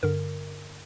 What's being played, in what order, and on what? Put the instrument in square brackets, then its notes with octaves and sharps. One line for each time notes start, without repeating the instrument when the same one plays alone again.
[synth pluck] G2 D3 A#4